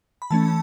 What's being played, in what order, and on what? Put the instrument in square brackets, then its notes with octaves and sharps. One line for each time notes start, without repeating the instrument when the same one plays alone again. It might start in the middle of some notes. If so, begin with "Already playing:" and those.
[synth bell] B5
E3 A3 C#4 A5